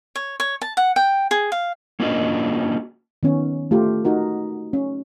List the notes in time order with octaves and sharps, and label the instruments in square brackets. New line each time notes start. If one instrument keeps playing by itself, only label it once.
[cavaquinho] C#5
C#5
A5
F#5
G5
G#4
F5
[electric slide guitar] A#3 C#4 D4 F4 F#4 D#5
[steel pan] D#3 B3 C#4
A3 F4 G4
D#4 F#4 A#4
C#4